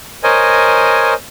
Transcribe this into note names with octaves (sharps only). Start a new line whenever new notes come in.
A#4 C5 C#5 D#5 G#5